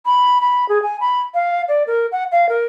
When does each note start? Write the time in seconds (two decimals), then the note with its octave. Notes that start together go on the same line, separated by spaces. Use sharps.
0.06 B5
0.41 B5
0.69 G#4
0.83 G#5
1.00 B5
1.34 F5
1.68 D5
1.87 A#4
2.12 F#5
2.32 F5
2.49 A#4